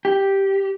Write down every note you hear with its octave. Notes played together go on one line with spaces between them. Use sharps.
G4